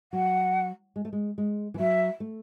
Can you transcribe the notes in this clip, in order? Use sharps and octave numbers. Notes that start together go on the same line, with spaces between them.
F#3 F#5
G#3
A3
G#3
G#3
E3
F#3 E5
A3